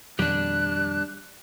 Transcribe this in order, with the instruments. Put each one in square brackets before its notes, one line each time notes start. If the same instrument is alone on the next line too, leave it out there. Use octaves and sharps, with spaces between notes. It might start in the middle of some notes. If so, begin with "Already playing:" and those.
[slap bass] F2 B2 D#3 [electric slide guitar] G3 D4 [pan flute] F#6